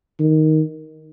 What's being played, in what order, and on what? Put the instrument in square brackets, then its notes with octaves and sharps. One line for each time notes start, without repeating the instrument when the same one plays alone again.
[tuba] D#3